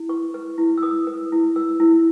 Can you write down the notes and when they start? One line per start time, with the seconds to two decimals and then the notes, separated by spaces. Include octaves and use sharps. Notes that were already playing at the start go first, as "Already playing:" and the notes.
Already playing: E4
0.09 B4 C#6
0.34 B4
0.58 E4
0.78 E6
0.83 B4 D#6
1.07 B4
1.32 E4
1.56 B4 E6
1.80 E4